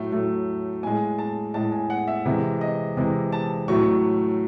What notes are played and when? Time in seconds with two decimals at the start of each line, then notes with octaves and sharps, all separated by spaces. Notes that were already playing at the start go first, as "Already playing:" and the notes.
Already playing: A2 F#3 A3
0.12 A2 F#3 A3
0.83 A2 G#3 G#5
1.19 A5
1.54 A2 G#3 A5
1.72 G#5
1.90 F#5
2.08 E5
2.25 C3 E3 G#3 E5
2.61 D#5
2.97 C3 E3 G#3
3.32 A5
3.68 A2 F#3 A3 C#6